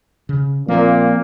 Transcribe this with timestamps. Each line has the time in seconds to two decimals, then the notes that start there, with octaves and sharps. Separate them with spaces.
0.29 C#3
0.68 A#2 F3 A#3 C4